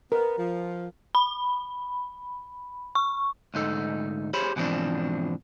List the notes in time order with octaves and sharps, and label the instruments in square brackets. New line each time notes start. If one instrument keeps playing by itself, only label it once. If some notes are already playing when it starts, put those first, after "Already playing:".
[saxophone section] B3 [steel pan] A#4
[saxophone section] F3
[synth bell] B5
C#6
[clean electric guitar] D2 G#2 D#4 A4
G4 G#4 C5 C#5 B5
G#2 B2 E3 F3 C4 D4